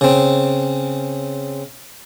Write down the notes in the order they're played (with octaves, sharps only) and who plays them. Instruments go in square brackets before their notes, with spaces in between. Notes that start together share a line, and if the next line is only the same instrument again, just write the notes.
[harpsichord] C#3 C4